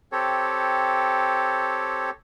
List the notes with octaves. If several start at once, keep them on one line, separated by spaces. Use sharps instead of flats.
C4 G4 A4 C#5